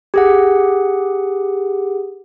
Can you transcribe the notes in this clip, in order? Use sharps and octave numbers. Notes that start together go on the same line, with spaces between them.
G4 G#4 F#5